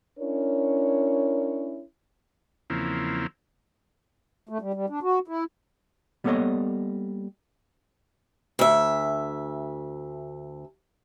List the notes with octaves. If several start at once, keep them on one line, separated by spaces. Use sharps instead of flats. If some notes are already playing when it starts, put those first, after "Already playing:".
C#4 D4 E4 A#4 C#5
E2 C#3 F3 A#3 C4 E4
A3
G3
G3
D4
F#4
E4
G3 A#3 B3 A4 C#5 D#5
D2 E5